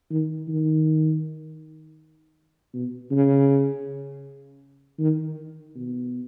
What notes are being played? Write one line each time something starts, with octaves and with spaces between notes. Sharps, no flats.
D#3
D#3
B2
C#3
D#3
B2